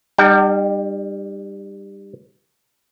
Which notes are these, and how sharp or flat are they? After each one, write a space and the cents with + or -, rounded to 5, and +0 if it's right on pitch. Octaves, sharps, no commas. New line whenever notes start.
G3 +15 D#4 -40 G5 -40